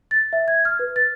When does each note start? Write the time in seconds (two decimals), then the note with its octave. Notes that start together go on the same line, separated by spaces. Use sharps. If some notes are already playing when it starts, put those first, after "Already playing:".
0.11 A6
0.33 E5
0.48 G#6
0.65 F6
0.79 B4
0.96 A6